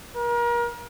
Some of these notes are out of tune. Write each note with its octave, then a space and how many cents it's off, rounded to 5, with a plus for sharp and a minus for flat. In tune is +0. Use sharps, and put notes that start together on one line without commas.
A#4 +35